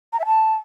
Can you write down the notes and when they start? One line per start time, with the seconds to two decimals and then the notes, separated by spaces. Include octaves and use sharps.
0.12 A#5
0.19 E5
0.26 A5